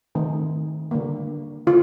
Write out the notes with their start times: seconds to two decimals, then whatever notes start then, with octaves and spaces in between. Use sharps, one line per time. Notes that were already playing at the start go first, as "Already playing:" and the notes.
0.15 D#3 A3 C4
0.91 D3 G3 A#3
1.67 D3 F4